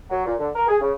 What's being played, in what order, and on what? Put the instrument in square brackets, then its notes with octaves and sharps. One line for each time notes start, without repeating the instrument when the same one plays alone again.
[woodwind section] F#3
A#2
D3
A#4
G#4
C#3